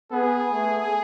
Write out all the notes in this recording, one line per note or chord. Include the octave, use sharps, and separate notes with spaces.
B3 G#4
A3